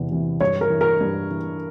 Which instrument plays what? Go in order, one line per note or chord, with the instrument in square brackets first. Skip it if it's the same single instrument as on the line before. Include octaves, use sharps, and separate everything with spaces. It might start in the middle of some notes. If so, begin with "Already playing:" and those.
Already playing: [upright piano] E2 C3 E3
C3 E3
G2 C#5
A#4
E3
A#4
G2
E3